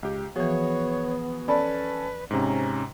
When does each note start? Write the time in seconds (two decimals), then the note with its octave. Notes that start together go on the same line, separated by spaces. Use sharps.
0.03 C#2 G4
0.36 E3 F3 B3 F#4 G#4 C#5
1.48 C#4 A4 B4 D5 A5 B5
2.31 G#2 C3 C#4 A#5